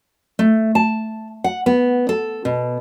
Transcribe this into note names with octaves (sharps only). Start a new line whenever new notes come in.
A3
A5
F#5
B3
A4
B2